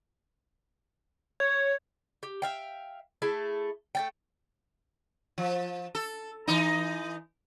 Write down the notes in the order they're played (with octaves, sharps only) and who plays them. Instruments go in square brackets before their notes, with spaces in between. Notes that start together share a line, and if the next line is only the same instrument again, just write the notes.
[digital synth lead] C#5 [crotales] G#6
[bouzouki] G4
E5 F5 G5
A3 E4 G#4 A5
A3 D5 G5
[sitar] F3
A4
E3 D#4